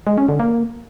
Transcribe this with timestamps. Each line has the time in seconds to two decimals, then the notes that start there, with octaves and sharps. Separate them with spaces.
0.07 G#3
0.18 C#4
0.29 D3
0.40 A#3